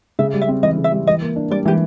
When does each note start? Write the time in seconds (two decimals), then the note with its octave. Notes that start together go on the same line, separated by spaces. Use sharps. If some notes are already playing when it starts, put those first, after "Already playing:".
0.19 C#3 E5
0.34 G3
0.42 E5
0.48 C4
0.63 E3 D#5
0.78 C#3
0.84 E5
0.92 G3
1.07 E3 D#5
1.22 A#3
1.36 D4
1.50 G3 D5
1.65 E3 G4